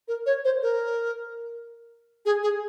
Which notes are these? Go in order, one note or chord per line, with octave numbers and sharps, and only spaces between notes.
A#4
C#5
C5
A#4
G#4
G#4